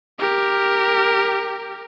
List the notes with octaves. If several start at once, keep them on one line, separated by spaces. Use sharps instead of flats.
G4 A#4